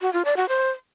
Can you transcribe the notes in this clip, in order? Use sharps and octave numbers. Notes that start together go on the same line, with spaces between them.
F#4
F4
D5
F#4
C5